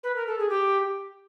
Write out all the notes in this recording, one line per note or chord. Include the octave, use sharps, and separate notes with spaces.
B4
A#4
A4
G#4
G4